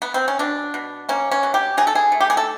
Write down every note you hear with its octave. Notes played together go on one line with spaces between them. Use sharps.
B3
C4
C#4
B2 D4
B2
A#3 C#4
C#4
B2
G4
F#3 G#4
A4
G#4
A3
G4
G#4
A4